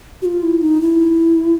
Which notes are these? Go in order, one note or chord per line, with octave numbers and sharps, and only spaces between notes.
F#4
F4
E4
D#4
E4